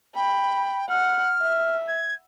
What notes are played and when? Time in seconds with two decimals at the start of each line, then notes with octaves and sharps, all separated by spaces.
0.16 G5 B5
0.89 F#5 F6
1.42 E5
1.88 G#6